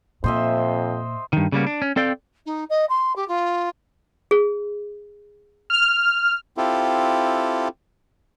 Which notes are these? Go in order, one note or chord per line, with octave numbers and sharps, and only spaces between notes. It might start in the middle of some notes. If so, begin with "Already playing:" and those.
F2 A#2 C5 D#5 E5
G2 D#3
C#3 G3 A#3 B3
D4
C#4
C4 A4 D5 F5 G5
D#4
D#5
C6
G4
F4
G#4
F6
C4 E4 F4 G4 A4